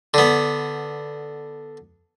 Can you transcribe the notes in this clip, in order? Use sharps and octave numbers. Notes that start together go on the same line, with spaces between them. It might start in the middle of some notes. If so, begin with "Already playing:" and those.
D3 B3